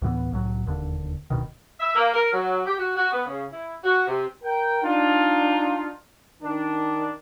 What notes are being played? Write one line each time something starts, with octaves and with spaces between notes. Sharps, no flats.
D2 A2 E3 B3
C2 A2 F#3
E1 D#2 D3
D1 B2 D#3
E5
A#3
A#4
F#3
G4
F#4
F#4
B3
C#3
E4
F#4
C3
A#4 G5
D4 D#4 F4
D#3 D4